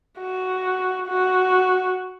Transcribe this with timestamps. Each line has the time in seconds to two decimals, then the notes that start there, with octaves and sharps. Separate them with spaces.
0.20 F#4
1.08 F#4